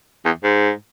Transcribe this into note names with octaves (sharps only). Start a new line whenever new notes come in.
E2
G#2